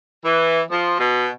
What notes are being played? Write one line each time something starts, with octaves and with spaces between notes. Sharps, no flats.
E3
F3
B2